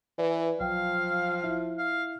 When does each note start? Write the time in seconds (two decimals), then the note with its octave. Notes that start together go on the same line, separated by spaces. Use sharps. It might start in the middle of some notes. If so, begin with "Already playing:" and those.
0.18 E3 B4 D5
0.60 B1 F3 F#3 F5 G5
1.44 E4 E5
1.78 F5